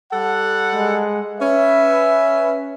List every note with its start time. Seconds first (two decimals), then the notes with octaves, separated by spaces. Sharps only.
0.12 G3 A4 F#5
0.74 G#3
1.40 C#4 B4 E5